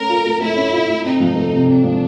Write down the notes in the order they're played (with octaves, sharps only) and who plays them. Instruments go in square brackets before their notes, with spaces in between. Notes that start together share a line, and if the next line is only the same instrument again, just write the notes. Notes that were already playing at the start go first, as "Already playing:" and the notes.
Already playing: [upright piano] A3 C#4 [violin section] A#4
[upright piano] F4
A3
[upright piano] A3 [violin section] E4
[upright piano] C#4
F4
A3
[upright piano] C4 [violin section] D#4
[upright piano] F3
A3
C3
[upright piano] C4 [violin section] D4
[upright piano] F3